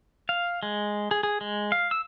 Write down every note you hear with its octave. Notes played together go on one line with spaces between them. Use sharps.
F5
G#3
G#4
G#4
G#3
F5
E6